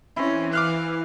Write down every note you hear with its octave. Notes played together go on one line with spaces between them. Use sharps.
E3 C4 C#4 E4 C5
F5 D6 F6 F#6